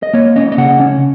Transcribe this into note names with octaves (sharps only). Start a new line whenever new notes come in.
D#5
A#3 C#5
C#4 D#5
D#5
C#3 F#5
C#4